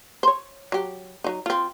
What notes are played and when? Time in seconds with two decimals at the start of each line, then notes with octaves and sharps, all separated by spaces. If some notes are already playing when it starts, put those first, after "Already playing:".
0.23 C5 C#5
0.72 F#3 G4
1.24 F#3 D#4
1.46 C4 F4